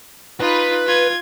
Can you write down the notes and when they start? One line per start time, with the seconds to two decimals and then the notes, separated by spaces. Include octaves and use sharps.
0.40 D#4 F4 B4
0.86 F4 G#6